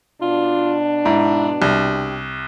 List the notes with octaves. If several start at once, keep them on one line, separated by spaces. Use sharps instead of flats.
B2 D4 F4
G#2 E4
C2 G4